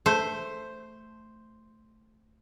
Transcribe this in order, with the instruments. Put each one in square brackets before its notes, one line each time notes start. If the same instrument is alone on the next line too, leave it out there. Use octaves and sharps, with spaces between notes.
[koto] A3 [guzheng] C5